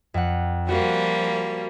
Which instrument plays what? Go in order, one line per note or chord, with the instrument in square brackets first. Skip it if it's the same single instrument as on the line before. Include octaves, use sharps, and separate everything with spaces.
[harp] F2 F#5
[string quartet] F3 G3 A#3 [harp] F#4